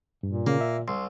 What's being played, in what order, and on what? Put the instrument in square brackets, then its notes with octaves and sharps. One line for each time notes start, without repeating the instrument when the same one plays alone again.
[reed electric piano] G2 [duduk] A#2
[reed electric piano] C#3 [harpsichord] A#3
[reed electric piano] E5
[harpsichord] C2 [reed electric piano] C6